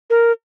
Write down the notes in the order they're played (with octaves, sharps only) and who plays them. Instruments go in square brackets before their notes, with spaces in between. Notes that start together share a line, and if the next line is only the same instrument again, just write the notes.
[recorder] A#4